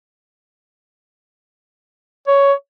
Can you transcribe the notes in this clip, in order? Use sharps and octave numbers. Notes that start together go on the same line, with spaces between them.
C#5